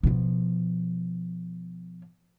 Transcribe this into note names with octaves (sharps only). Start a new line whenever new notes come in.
B2 F3